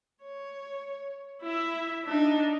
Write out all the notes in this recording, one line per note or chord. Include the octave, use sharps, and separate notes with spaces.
C#5
E4 E5
D4 D#4